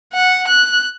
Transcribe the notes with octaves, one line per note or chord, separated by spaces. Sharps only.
F#5
F#6